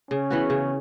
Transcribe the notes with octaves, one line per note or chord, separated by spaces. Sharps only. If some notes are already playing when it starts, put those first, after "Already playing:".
C#3 C#4
E3 B3 F#4
C#3